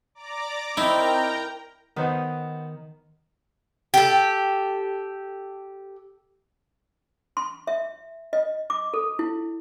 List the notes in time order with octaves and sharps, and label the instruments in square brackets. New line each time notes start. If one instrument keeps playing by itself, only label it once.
[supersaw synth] D5 A#5 D6
[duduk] C4 [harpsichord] D#4 [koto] E4 [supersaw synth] A#4 G5 A#5
[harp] D#3 [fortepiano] B3 C5 F#5
[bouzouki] G4 A4
[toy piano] C6
E5
D#5
D6
A4
E4